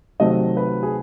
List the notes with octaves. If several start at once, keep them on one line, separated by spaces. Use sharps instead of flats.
C3 D#3 F#3 A3 C4 D#5
B4
G#4